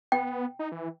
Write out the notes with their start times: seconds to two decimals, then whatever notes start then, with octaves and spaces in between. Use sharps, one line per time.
0.12 B3 G5
0.59 D#4
0.72 E3